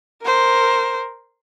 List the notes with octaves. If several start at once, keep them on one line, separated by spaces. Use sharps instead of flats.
A#4 C5